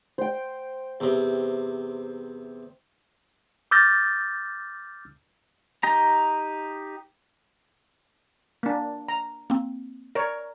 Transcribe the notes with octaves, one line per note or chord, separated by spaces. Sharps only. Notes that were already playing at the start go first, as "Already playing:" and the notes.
C5 G5
E2 C3
D6 E6 F6 G6 A6 A#6
D#4 G4 A#5
A#3 D4
A#5
A#3 C4
A#4 C#5 D5